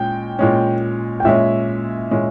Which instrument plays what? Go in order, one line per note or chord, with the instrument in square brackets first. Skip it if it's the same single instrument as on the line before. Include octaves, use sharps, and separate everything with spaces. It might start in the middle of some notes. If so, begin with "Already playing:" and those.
Already playing: [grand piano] A#2 G#3 C#4 [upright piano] G5
[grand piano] A#2 G#3 C#4
[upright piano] G5
[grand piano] A#2 G#3 C#4 [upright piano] E5
[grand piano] A#2 G#3 C#4